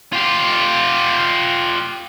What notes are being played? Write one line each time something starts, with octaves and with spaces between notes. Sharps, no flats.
F4 G4